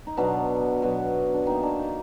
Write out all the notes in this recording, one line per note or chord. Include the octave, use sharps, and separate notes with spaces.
D#4
B2 F#3 B3 D4
B2 F#3 B3
D4
D#3 A#3 D#4
D4
D#4